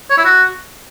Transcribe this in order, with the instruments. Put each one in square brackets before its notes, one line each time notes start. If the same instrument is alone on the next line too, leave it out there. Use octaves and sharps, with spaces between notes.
[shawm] C#5
E4
F#4